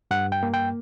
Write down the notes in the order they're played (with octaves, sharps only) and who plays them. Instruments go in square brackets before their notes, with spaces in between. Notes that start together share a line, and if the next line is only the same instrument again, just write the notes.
[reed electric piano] G2 F#5
G5
A#3
G5